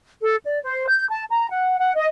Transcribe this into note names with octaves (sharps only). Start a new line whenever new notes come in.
A4
D5
C5
G6
A5
A#5
F#5
F#5
D#5